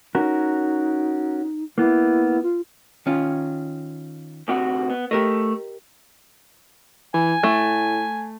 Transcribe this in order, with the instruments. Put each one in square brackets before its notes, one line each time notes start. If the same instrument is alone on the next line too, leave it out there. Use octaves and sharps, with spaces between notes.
[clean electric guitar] C#4 F#4 A#4 [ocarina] D#4
[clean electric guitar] A#3 B3 [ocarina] E4
[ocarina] F4
[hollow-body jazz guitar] D#3 C#4 F4
[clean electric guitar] D2 C3 F#4
B3
[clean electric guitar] A3 [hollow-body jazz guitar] G4 A#4 D#5
[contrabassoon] E3 [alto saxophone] G#5
[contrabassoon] A2 [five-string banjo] A3